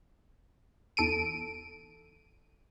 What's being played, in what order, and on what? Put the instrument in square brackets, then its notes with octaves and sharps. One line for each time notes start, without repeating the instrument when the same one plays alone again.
[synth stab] E2 A4 D7 D#7